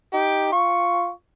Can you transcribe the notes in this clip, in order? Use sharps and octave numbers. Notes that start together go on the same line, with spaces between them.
D#4 G4
F4 C#6